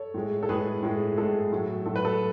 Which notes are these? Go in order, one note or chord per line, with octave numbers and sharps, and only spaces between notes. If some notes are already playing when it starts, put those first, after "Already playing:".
Already playing: A4 C#5
A2 G#3
A4
A2 G#3 G#4 B4
A2 G#3
A2 G#3 A4
A2 F#3
A2 F#3 A4
B4
A4